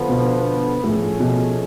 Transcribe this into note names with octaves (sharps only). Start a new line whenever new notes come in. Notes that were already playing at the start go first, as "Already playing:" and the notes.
Already playing: D3 F3 B3
B2
A2 F3 A3 C#4 G#4
B2